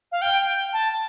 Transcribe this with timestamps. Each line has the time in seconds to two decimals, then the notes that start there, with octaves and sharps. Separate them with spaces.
0.12 F5
0.22 G5
0.73 A5